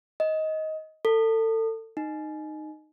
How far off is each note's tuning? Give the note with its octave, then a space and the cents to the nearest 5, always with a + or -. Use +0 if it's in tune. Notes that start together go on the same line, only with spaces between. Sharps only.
D#5 +15
A4 +30
D#4 -15